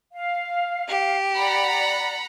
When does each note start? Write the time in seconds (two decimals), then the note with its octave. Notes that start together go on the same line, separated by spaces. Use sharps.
0.13 F5
0.89 G4
1.36 D5 F#5 A#5 B5